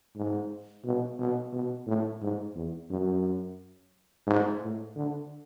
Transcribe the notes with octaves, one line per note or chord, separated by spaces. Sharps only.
G#2
B2
B2
B2
A2
G#2
E2
F#2
G#2
A2
D3